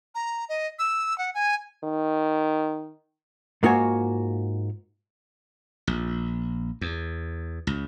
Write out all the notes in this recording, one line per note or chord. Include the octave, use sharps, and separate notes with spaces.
A#5
D#5
E6
F#5
G#5
D#3
G#2 A#3 F4 F#4 C#5 G#5
A#1
E2
C#2